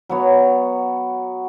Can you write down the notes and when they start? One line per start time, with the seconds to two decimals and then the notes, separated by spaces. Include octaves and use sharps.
0.09 F#3 B3 F#4 C#5